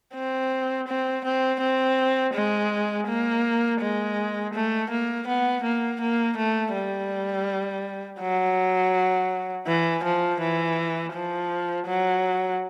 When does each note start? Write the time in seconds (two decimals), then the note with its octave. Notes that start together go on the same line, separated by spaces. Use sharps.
0.15 C4
0.88 C4
1.25 C4
1.61 C4
2.34 G#3
3.08 A#3
3.81 G#3
4.54 A3
4.90 A#3
5.27 B3
5.63 A#3
6.01 A#3
6.37 A3
6.74 G3
8.20 F#3
9.67 E3
10.04 F3
10.40 E3
11.13 F3
11.87 F#3